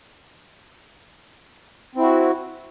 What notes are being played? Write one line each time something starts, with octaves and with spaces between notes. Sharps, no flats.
C4 E4 F#4